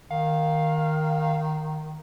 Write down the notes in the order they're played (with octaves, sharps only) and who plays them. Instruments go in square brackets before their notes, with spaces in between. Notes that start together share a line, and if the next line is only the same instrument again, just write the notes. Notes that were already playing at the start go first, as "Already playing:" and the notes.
[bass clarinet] D#3 [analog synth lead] F5